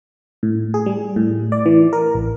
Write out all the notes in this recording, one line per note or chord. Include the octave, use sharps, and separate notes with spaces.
A2
G#4
G3
A2
D5
E3
A#4
A1